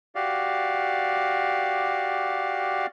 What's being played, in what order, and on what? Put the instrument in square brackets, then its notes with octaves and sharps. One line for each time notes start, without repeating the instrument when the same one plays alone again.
[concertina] F#4 G4 D5 F5